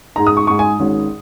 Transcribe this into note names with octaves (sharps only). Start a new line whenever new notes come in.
G#2 G#3 D#4 A#5
D#6
C#6
G#2 G#3 D#4 C#6
G#5
G#1 G#2 D#3 C#4